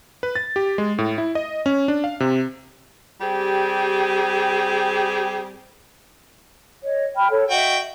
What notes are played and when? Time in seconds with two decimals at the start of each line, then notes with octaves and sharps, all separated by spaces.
0.23 B4
0.36 A6
0.56 G4
0.78 G#3
0.98 A2
1.18 E4
1.35 D#5
1.66 C#4
1.88 D4
2.04 F5
2.20 C3
3.20 G3 C4 G4 G#4
6.84 C#5 D#5
7.15 G5 B5 F6
7.29 A4 C#5
7.50 F#4 D#5 E5 F#5 G5